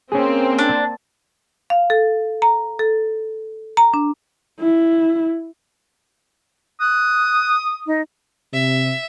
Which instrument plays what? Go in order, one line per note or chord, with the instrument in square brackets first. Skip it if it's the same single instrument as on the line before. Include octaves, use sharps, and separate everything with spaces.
[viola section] A#3 C4 [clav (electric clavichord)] C#4 G#4
[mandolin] D4
[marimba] F5
A4
A#5
A4
A#5
D4
[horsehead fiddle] E4
[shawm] D#6 [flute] F#6
[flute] D#4
[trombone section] C3 [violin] E5